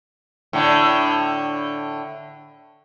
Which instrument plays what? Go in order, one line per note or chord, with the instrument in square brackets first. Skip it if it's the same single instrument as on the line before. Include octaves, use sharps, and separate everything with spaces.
[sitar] A2 D3